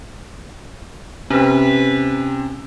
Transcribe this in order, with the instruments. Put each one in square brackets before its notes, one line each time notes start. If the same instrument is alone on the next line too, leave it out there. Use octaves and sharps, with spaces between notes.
[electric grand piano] C3 [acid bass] C#4 [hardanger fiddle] B4